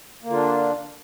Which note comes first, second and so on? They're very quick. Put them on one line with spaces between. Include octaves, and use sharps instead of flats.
A#3 D3 F4 D4